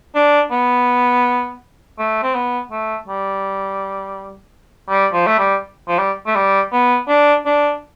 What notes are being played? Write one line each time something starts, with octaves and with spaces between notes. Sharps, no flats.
D4
B3
A3
C4
B3
A3
G3
G3
F3
A3
G3
F3
G3
A3
G3
B3
D4
D4